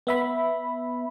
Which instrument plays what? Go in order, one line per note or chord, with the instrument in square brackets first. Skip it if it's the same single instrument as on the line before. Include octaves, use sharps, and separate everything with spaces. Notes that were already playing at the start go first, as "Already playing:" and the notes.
[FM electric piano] B3 E5 B5